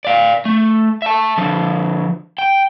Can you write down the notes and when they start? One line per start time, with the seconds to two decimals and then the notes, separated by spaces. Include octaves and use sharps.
0.05 D5 F5
0.45 A3
1.02 E5 A5
1.38 D3 F3
2.38 G5